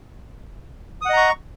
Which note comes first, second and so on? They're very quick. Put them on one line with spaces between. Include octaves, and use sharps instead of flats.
D#6 F#5 D#5 A#5 C#6